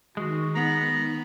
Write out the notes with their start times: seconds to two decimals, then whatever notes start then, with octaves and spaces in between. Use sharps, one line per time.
0.17 D#3 G#3 F#4
0.55 B3 A#5